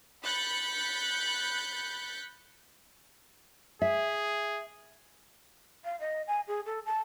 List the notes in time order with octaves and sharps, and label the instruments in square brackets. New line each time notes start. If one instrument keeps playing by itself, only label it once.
[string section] B5 F#6 G6 A6 B6 C#7
[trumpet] G#4 [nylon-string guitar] E5
[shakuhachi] F5
D#5
G#5
G#4
A4
A5